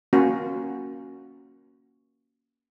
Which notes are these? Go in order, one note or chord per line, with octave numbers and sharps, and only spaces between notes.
A#3 C#4 F#4